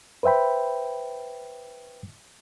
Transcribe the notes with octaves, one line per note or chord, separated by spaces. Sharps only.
B4 C5 E5 G5 B5